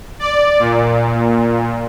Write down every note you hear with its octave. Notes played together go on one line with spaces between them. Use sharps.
D5
A#2